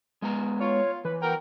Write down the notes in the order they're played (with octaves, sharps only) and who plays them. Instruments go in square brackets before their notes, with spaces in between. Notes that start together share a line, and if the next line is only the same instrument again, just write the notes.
[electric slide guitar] G#3 B3 A#5
[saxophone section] F4 [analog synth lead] C#5
[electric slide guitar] E3 [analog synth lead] B4
[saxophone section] B3 F#4 A#4 [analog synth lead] G5